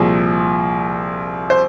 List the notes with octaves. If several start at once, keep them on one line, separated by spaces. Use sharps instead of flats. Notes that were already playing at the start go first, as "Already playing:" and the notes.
Already playing: C2 A#2 F3 G#4
C5